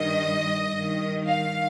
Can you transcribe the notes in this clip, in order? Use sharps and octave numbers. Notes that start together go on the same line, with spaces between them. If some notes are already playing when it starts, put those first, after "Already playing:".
Already playing: G2 D#3 D#5
G2 D#3
F5